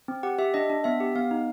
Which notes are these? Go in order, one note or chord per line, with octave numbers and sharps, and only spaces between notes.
C4
G4 F#5
G4 E5
D4 D#5
D4
B3 E5
G4
B3 F5
D#4